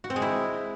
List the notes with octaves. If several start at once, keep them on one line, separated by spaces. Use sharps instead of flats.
F#4
C4
G#3
E4